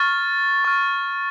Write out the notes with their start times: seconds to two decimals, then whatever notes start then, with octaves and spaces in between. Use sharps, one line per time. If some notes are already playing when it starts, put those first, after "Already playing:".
Already playing: C#6 F6 A6
0.65 C#6 F6